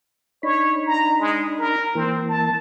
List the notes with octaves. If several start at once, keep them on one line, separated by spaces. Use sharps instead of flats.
D4 D#4 C#5 B5
A#5
G#3
A#4
E3 A#3 C4
A5